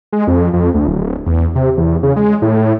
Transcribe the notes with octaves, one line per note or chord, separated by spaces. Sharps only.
G#3
F2
F2
D2
D1
E2
C3
E2
C#3
G#3
A2